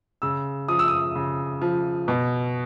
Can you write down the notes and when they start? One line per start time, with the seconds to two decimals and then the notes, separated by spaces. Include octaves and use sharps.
0.22 C#3 E6
0.68 F3 D#6
0.79 E6
0.88 D#6
1.15 C#3
1.61 F3
2.08 B2